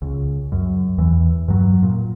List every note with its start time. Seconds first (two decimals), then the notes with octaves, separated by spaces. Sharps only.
0.02 C#2
0.52 F#2
0.98 E2 E3
1.48 G2 F#3
1.83 A#2